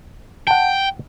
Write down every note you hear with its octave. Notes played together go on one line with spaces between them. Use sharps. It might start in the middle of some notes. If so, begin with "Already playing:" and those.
F#5 G5 A5